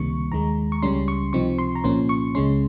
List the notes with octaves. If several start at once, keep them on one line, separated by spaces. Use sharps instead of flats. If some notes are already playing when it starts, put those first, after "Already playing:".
Already playing: C#2 C3 D#3 G3 A#3 C#6
D#2 D#3 G#3 A#5
C#6
C#2 C#3 G3 C#4 C6
C#6
C#2 C3 F3 C4 D#4 C#6
C6
A#5
C2 A#2 F3 A#3 C#4 C6
C#6
C#2 C#3 G#3 C#4 C6